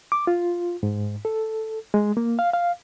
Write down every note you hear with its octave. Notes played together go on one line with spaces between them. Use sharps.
D6
F4
G#2
A4
G#3
A#3
F5
F5